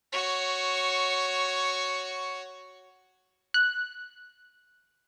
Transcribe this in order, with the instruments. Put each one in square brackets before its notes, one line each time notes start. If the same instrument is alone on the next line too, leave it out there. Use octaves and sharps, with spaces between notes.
[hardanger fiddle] F#4 C#5
[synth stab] F#6